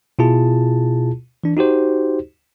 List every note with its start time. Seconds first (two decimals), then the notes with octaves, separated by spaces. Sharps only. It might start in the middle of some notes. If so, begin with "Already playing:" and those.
0.19 B2 E4 F4 G#4 A5
1.44 E3 D4
1.57 D#4 F#4 G4 C5